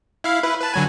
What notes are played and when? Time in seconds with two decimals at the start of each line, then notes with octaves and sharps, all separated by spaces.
0.24 E4 F5
0.43 E4 B4
0.61 B4 A5
0.74 D3 F#3 G#5